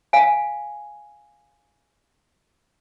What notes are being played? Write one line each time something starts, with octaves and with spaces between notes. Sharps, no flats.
F5 G#5